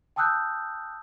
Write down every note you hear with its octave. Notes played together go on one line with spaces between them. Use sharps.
G5 A5 D#6 E6 F#6 G6